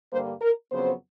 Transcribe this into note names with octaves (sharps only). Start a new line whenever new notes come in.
G2 D3 G3 A#3 C5
A#4
F2 C#3 F#3 B3 C5